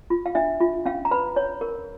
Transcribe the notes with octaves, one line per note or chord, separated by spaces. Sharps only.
F4
F5
D4 E5
F4
C#4 F5
A#5
B4 B5
C#5
A#4